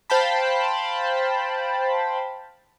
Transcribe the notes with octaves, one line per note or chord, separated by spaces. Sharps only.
C5 F5 G5 A5 B5